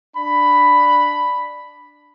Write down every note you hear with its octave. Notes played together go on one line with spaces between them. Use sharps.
D4 B5